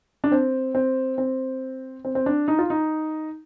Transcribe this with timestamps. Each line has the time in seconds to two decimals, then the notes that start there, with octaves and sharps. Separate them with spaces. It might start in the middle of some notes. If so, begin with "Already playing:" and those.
0.24 D4
0.32 C4
0.75 C4
1.18 C4
2.05 C4
2.15 C4
2.26 D4
2.48 D#4
2.59 F4
2.70 D#4